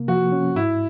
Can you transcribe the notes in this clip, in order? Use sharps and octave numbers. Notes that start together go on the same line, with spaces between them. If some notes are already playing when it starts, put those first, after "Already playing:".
Already playing: C3 A#3
F3 F#4
C#4
G#2 E4